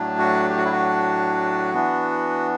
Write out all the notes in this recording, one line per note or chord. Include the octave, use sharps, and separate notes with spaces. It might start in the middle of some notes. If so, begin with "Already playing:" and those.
Already playing: A2 F#3 A3 D4
F#4
G4
F#4
E4
F#4
E3 B3 D4